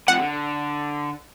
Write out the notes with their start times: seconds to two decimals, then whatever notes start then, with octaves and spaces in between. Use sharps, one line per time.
0.08 C3 F3 F#5
0.20 D3